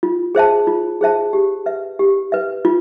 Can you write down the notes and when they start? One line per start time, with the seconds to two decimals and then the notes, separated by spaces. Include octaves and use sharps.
0.03 F4
0.35 G#4 C5 E5 A5
0.67 F4
1.01 G#4 C5 E5 A5
1.33 G4
1.66 B4 E5
1.99 G4
2.32 B4 E5
2.65 F4